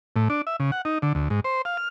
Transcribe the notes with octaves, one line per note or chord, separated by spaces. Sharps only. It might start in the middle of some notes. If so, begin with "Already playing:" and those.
A2
D4
E5
C#3
F#5
D#4
D3
D2
G#2
C5
F5
F6